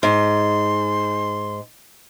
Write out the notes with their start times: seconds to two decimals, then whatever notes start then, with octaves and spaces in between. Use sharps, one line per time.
0.03 G#2 C6